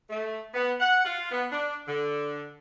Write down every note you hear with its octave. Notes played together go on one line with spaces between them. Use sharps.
A3
B3
F#5
F4
B3
D4
D3